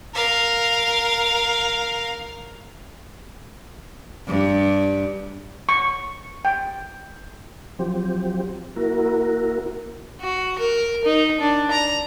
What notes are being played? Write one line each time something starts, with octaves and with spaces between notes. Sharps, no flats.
A#4 F5
G2
C#6
G5
F3 F#3 C4 G4
A#3 E4 F#4 A#4
F#4
A#4
D#4
D4
A#5